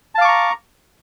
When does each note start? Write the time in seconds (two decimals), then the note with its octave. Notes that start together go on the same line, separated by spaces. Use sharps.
0.15 A5
0.18 F5
0.21 D6
0.25 C#6
0.28 A#5